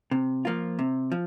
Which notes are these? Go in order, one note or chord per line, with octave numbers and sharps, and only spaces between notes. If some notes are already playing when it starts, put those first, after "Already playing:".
C3
F3 A#3 F4
C3
F3